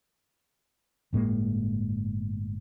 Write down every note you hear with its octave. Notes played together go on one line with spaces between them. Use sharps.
G1 A2 G#3 A#3